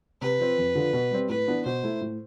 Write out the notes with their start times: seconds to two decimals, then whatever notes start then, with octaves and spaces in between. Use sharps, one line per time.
0.21 C3 B4
0.39 F3 C4
0.58 F2
0.75 D3 F3
0.93 B2
1.11 G3 C4
1.29 A2 B4
1.47 E3 B3 D4
1.65 B2 C5
1.83 A3 E4
2.01 A2